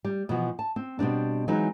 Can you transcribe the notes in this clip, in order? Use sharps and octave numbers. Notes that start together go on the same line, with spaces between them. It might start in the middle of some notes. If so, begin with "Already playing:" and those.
G3
B2 E3 F3 F#4
A5
C4
B2 G3 C4 D4
E3 F#3 G#3 C4 D#4